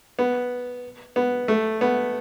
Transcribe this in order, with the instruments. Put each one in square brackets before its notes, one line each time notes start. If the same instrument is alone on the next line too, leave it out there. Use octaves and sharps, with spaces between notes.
[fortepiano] B3
B3
A3
B3